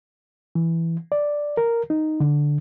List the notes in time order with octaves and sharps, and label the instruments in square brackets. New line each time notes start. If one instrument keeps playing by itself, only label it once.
[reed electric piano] E3
D5
A#4
D#4
D3